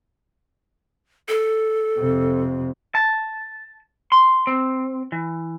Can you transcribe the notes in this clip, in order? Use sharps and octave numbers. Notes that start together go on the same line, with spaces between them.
A4
F2 C3
A5
C6
C4
E3